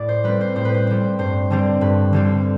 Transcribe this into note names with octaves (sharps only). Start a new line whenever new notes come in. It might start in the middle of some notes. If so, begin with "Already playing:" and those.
Already playing: A2 D5
C5
G3 C4 B4
C5
A2 C5
B4
C5
G3 C4
G2 C5
D3 G3 C4
G2 B4
D3 G3 C4